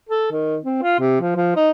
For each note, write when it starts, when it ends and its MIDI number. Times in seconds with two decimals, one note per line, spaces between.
0.09 0.30 69
0.31 0.58 51
0.64 0.78 60
0.82 0.97 65
0.99 1.19 48
1.20 1.35 53
1.36 1.52 53
1.56 1.70 63